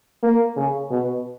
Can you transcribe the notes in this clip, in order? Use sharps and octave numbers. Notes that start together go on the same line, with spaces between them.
A#3
C#3
B2